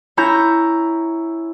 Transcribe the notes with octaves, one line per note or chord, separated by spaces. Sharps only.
C#4 E4 A#5 G6